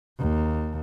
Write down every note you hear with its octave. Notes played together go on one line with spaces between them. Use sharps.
D#2